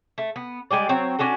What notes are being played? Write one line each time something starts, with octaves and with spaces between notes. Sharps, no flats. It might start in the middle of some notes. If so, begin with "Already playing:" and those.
A3
B3
G3 G#3 G4 D5
F#3 C4 C#5
C#4 D4 F#4 A4